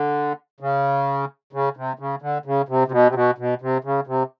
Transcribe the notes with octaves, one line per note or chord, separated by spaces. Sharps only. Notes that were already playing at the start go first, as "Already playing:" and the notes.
Already playing: D3
C#3
C#3
C3
C#3
D3
C#3
C3
C3
B2
C3
B2
B2
C3
C#3
C3